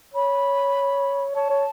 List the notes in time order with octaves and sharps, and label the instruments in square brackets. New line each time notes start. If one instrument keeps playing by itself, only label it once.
[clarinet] C#5 [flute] B5
[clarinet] C#5 [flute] A5
[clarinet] C#5